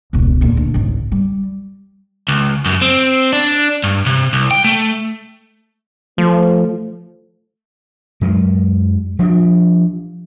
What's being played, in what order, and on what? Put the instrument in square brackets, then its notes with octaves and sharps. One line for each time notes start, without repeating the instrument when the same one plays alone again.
[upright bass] E1 C#2
D2 A#2
D2
G#1 C#2
G3
[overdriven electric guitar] C#2
F#2
C4
D4
G2
C3
C2
G5
A3
[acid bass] F3 [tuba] A3
[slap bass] F#2 F#3 G#3
F3 G3 D4